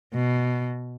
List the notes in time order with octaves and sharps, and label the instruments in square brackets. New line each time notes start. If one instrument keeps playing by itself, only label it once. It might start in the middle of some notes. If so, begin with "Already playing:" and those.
[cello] B2